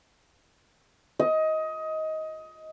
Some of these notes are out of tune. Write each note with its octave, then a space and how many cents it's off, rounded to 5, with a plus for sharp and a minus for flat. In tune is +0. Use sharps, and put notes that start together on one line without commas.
D#5 +20